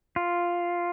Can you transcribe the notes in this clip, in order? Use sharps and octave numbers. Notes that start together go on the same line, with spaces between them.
F4